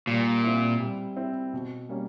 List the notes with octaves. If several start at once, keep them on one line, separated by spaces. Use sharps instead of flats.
A#2 G3
C4 E4
G3
C4 E4
B2
G3 A#3 C#4